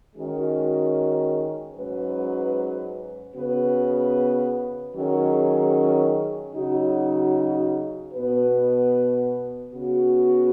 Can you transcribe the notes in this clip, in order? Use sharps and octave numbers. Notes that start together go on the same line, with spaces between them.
D#3 G#3 C#4 F#4
G#2 F#3 C#4 B4
C#3 B3 F#4 B4
D#3 F#3 C#4 G#4
C#3 F#3 D#4 F#4
B2 B3 F#4 B4
C#3 B3 F#4